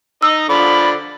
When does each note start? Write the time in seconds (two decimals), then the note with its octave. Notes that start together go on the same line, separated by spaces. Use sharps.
0.22 D#4 D#5 E6
0.49 D3 F3 D5 B5